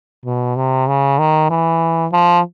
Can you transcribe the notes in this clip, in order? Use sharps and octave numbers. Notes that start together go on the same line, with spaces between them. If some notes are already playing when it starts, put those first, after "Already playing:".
B2
C3
C#3
D#3
E3
F3